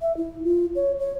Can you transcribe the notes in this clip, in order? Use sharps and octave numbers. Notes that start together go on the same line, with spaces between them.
E5
E4
F4
C#5
C#5